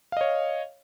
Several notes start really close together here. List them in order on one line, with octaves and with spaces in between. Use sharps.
F5 D#5 C#5